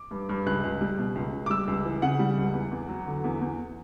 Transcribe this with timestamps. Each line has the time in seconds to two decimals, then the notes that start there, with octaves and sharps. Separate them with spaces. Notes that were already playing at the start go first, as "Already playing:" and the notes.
Already playing: D6
0.11 G2
0.29 G2
0.46 C#2 F#6
0.64 C#2
0.81 G3
0.98 B2
1.15 C#2
1.32 C#2
1.46 D6
1.50 G3 E6
1.68 C#2
1.85 E3
2.02 C#3 F#5
2.19 G3
2.37 C#2
2.54 E2
2.71 E2
2.89 F#3
3.06 D3
3.24 E2
3.41 E2